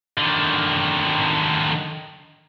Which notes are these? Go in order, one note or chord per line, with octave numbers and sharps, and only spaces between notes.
D3 D#3